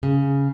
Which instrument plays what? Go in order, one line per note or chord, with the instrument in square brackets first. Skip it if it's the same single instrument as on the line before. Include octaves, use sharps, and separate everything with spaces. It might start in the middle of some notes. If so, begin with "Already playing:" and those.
[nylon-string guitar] C#3